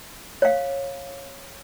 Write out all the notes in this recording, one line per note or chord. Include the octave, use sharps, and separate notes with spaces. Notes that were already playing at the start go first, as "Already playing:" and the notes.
C#5 F5